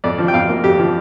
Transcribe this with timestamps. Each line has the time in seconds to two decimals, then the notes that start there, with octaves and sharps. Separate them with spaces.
0.04 F2 D5
0.19 F3
0.28 G5
0.33 F2 F5
0.49 A#3
0.64 F2 G4
0.79 F3